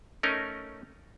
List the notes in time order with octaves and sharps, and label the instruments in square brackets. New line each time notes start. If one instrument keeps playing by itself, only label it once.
[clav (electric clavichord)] A3 C#4 D#4 A#4 D#5